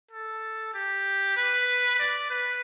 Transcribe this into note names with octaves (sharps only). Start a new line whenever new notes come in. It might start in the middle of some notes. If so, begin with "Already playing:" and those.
A4
G4
B4
D5
B4